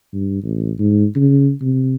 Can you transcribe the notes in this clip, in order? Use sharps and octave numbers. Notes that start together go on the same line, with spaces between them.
G2
A1
G#2
C#3
C3